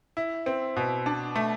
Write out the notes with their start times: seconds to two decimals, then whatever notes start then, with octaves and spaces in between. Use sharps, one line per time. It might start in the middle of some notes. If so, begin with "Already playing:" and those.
0.17 E4
0.46 C4
0.76 B2
1.06 D4
1.36 A3